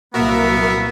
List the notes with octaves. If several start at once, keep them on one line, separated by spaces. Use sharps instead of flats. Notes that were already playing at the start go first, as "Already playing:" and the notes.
C2 A#2 F#3 A#3 B3 F#4 A#4 E5